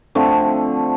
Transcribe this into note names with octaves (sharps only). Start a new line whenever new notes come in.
D3 F3 A3 C4